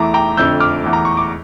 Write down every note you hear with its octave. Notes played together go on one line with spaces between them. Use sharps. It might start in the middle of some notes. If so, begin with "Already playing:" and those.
Already playing: E2 E3 A3 A#5 D6
G5 A#5
F2 D3 A3 E6 G6
D6 F6
E2 E3 A3
A#5
C#6
D6